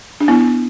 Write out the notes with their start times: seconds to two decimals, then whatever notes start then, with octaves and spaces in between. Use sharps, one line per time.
0.20 D4
0.28 B3 E4